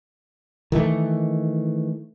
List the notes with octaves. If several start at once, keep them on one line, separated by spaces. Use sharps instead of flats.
D#3 E3 A3